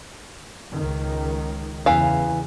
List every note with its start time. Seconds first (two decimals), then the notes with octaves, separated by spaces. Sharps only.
0.74 C#2 D#3
1.86 E2 C#3 E3 F5